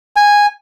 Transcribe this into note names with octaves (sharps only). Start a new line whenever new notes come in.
G#5